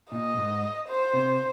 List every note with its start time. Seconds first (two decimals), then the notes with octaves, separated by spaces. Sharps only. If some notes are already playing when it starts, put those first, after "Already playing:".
0.12 A#2 D#5
0.37 G#2
0.89 C5
1.13 C3